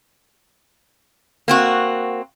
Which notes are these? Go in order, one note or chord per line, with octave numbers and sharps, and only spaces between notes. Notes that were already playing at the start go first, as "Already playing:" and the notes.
A#3 C4 F#4